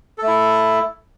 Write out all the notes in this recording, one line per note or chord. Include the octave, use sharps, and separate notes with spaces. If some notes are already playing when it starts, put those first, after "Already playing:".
A3 E4 A4